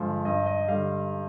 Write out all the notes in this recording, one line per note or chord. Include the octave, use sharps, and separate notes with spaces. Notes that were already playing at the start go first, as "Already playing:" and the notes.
Already playing: G2 D3 F3 G#3
G2 D#5
D#5
D3 G3 F5